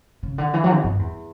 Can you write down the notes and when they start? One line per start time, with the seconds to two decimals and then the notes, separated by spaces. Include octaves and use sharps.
0.23 C#3
0.38 D3
0.54 E3
0.64 F#3
0.74 B2
0.84 G2
0.99 E2